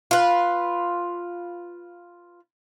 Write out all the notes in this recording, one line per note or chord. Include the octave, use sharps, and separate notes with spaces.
F4 B4